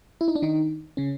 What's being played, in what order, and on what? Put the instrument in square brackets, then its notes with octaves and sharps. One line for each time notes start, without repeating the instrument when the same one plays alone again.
[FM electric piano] E4
D#4
D4
D#3 D#4
C#3 C#4